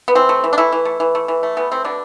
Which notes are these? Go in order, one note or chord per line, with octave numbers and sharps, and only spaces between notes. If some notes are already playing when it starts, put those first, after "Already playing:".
B3
E3 C4
A3
E3
D4
E3 A3 E4
E3
A3
E3
A3
E3
A3
E3 B3
A3 C4
B2 D3 D4